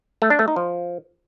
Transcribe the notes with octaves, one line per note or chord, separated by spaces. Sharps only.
A3
D4
A3
D#4
F3